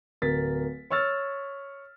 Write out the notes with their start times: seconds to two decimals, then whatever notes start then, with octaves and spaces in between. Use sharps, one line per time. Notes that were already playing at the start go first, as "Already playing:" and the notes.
0.22 D1 A#4 A6 B6
0.90 C#5 C#6 E6 F6 A6